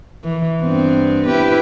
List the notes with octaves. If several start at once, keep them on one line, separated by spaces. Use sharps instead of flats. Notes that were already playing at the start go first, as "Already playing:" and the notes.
E3
G2 B3 C4
E4 G4 B4